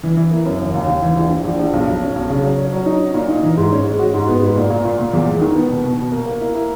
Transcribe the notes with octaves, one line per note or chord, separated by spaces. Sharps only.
E3
E3
A#3
F#2
D#2
D#2
D#2
E3
A#1
A#1
A#1
A#1
B1
B1
C#4
B1
C#3
F#3
C#4
F#3
D#4
D#4
A#2
D#4
E3
G#2
C#4
G#3
F#4
G#2
B3
G#2
A#2
A#2
A#2
A#2
E2
G#3
D#3
B3
B2
B2
B2
A#3
A#3
E4
A#3